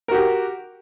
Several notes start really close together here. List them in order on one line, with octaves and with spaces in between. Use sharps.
A#4 F#4 G4